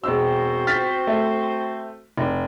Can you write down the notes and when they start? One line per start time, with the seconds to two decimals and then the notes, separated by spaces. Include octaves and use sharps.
0.04 E1 C4 F#4 C5 E6
0.67 F6 A6 B6
1.07 A3
2.18 F1